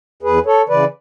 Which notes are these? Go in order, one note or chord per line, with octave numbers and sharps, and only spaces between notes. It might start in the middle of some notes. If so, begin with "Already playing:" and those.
E2 G#4 B4
A4 C#5
C#3 E3 B4 D5